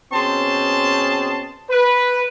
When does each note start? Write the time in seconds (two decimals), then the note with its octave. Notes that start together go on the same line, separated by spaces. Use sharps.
0.13 B2 C4 C#4 G#4 A5 C6
1.70 B4